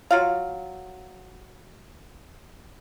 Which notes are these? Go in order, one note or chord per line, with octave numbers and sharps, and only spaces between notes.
F#3 F4 F5